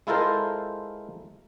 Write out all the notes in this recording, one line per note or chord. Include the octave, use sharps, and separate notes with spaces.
G#3 E4 F4 A4 A#4 C5